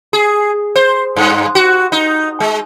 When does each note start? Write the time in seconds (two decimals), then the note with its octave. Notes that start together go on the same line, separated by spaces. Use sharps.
0.13 G#4
0.76 C5
1.16 G2
1.55 F#4
1.92 D#4
2.40 G#3